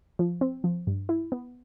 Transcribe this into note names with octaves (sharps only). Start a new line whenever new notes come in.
F3
C4
F3
G2
E4
B3